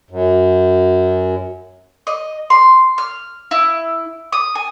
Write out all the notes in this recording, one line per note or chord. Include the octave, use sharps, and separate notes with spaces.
F#2
D#5
C6
F6
E4
D#6
G#5